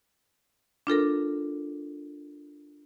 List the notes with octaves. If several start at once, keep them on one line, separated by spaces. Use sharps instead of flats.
D4 F4 A4 A#4